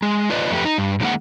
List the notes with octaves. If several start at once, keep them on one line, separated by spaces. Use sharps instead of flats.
G#3
F4 B4 D5 D#5
F2 A3 G4 B4
D#4
G2
A#2 D#3 G#3 A#3 F#5